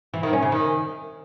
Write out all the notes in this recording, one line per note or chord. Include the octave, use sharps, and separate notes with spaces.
E3
D#3
C#4
C#3
D#3